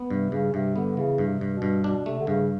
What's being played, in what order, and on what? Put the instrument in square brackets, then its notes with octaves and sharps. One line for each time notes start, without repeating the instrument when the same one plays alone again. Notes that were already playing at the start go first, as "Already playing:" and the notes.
Already playing: [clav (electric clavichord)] B3
[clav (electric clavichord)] G2 [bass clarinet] C3
[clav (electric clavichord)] G2 [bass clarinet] C#3
[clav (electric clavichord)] G2 [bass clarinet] C3
[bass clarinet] D3 [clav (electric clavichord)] B3
[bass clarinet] C#3 [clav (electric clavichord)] E3
[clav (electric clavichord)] G2
[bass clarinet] C3
[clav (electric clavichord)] G2
[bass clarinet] B2
[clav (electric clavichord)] G2
[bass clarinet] B2 [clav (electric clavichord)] D4
[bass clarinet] C3 [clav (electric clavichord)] A3
[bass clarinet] D3
[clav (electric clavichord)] G2 [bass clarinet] C#3